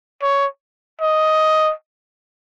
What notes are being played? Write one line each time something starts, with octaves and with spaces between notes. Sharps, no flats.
C#5
D#5